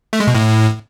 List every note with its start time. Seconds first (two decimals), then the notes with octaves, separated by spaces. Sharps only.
0.13 A3
0.20 G#3
0.27 B2
0.35 A2